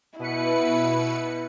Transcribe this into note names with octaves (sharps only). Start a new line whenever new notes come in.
B2 E4 B4 C#7